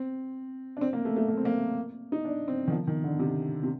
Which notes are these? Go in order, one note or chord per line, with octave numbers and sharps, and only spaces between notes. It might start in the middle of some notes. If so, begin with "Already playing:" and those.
Already playing: C4
D4
C4
A#3
A3
A3
A#3
C4
A#3
D#4
D4
C4
D#3
F3
D#3
D3
C3
C3